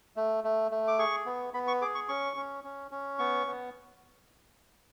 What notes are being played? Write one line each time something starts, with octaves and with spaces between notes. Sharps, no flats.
A3
A3
A3
D6
G#4 C#6
B3
B3 B5
C#6
G#4 D6
C#6
C#4 C#6
C#4
C#4
C#4
B3 C#6
B3